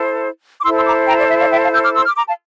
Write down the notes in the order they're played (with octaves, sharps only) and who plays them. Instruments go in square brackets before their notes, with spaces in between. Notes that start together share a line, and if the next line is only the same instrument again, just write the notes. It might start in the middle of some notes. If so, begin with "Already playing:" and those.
Already playing: [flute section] E4 A4 C5
D6
E4 A4 C5 C6 E6
C6 E6
A#5 D6
G5 A#5
D5
E5
D5 F5
E5 G5
F5 A5
E6 G6
D6 F6
C6 E6
D6 F6
A#5 D6
F5 A5